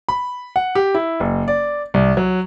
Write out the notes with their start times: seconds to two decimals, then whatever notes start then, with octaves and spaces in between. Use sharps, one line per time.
0.09 B5
0.56 F#5
0.75 G4
0.95 E4
1.20 F#1
1.48 D5
1.94 C2
2.17 F#3